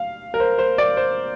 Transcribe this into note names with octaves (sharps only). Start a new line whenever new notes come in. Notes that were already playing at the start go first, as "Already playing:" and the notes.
Already playing: F5
A#4
C5
C5
D5
C5